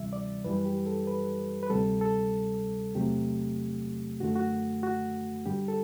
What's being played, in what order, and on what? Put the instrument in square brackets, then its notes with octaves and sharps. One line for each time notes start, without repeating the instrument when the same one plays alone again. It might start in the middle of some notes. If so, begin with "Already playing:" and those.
Already playing: [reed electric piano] D2 C3 E3 G3 E5
D5
F#2 E3 G3 B4
G4
A4
B4
B4
D2 C3 G3 A4
A4
E2 C3 F#3 A3 G4
F#2 D3 A3 F#4
F#4
F#4
G2 D3 G3 G4
A4